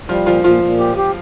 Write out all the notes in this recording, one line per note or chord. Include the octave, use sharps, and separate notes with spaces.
F3 G3 F4
A#2 F3 F4
A#2 F3 F4
A#2
G4
G4